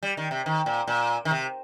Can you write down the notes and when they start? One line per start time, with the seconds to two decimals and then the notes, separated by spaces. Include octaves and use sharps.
0.03 G3
0.17 D#3
0.31 C3
0.46 D#3
0.66 A#2
0.87 A#2
1.25 D#3
1.31 C3